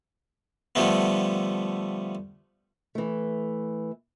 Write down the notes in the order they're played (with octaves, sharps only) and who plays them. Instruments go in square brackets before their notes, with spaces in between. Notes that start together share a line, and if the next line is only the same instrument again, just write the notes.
[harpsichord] D3 F3 G3 A3 B3
[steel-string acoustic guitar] E3 A3